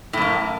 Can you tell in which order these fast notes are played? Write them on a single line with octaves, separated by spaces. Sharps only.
A2 F#2 A#3